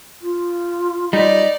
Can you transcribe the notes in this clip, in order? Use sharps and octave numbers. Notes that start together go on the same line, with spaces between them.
F4
G3 D#4 D5